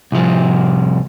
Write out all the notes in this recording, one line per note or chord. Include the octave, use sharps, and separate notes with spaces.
C2 F3